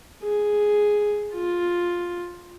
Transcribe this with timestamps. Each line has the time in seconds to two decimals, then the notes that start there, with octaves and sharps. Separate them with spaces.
0.23 G#4
1.34 F4